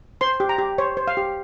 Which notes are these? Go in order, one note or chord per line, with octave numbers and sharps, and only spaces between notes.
C5 C6
G4
A#5
G4
C5 C#5
C5
F5
G4